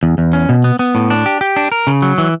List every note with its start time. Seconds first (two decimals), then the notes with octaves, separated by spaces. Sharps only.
0.03 E2
0.18 E2
0.33 C#4
0.49 B2
0.64 B3
0.79 B3
0.95 A2
1.10 D4
1.26 G4
1.41 G4
1.56 D4
1.72 A#4
1.87 C#3
2.02 F#3
2.18 E3